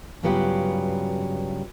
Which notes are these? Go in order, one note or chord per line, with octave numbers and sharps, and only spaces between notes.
G2 C#3 F#3 B3 F4 G4